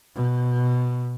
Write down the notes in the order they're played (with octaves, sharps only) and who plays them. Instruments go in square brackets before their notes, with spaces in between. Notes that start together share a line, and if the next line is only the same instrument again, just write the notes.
[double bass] B2